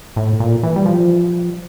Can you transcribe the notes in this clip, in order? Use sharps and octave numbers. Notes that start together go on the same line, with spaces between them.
A2
A#2
E3
G3
F3